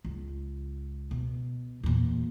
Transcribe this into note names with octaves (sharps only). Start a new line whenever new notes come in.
C#2
B2
E2 A#2